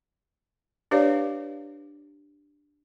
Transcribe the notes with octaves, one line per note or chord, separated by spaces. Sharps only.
D4 G4 B4 C#5 D5 F5